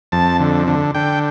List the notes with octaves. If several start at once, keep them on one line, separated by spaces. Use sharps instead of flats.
F2 A5
D3
D3
D3 G5